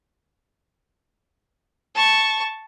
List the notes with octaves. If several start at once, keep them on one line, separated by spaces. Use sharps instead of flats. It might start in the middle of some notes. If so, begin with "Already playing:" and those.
A5 C#6